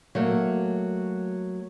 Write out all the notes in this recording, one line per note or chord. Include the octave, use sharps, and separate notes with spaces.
F#3 A3 A#3